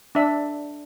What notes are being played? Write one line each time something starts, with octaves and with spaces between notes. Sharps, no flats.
D4 E5